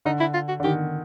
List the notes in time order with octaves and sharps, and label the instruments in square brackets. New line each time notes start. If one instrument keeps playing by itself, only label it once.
[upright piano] D3 [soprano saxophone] D#4
[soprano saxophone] E4
F4
F#4
[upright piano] D3
[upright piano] D#3 [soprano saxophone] G4